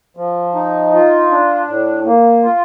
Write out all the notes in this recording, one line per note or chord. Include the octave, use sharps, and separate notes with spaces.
F3
D#4
F4
D4
A2
A#3
F4